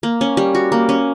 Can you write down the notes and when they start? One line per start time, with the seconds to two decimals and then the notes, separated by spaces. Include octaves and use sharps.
0.03 A#3
0.21 C#4
0.37 G3
0.55 F#4
0.72 A#3
0.89 C#4